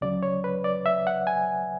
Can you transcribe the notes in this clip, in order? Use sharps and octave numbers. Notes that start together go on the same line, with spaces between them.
D2 C#3 F#3 D5
C#5
B4
D5
E5
F#5
G#5